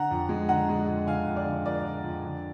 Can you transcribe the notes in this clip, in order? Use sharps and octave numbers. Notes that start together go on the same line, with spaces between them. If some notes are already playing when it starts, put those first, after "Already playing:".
Already playing: D3 F#5 A#5
F2
G#3
D3 F#5 A#5
G#3
F2
D3 F5 G#5
F2
D5 F5
D3
F2 A#4 D5
F2
F2
D3